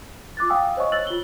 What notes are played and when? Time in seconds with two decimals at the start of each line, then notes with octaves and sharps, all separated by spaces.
0.37 F4 D6 F#6 A6
0.49 F5 G5 G#5 D#6 E6
0.77 C5 C#5 D#5 G#5 C#6
0.92 E6 F#6 A6 F#7
1.07 F4 G7